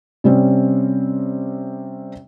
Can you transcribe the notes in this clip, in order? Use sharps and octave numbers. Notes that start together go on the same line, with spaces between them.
C3 G3 C4 C#4